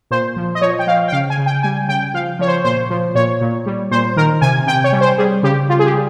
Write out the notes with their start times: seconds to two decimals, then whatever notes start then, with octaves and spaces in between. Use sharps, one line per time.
0.11 A#2 C5
0.37 F3
0.55 D#5
0.61 F3 C#5
0.79 G5
0.87 F3 F5
1.08 G5
1.12 C#3 F5
1.30 G#5
1.38 C#3
1.46 G5
1.63 G3 G#5
1.88 C#3 G5
2.14 F3 F5
2.39 F3 C#5
2.48 C5
2.64 A#2 C5
2.90 F3
3.15 A#2 C#5
3.41 A#2
3.66 G3
3.91 A#2 C5
4.17 D#3 A#4
4.41 C3 G#5
4.67 C3 G5
4.84 C#5
4.92 G3
5.01 C5
5.18 G3 G#4
5.43 C#3 G4
5.68 C#3 F4
5.79 G#4
5.86 G4
5.94 G3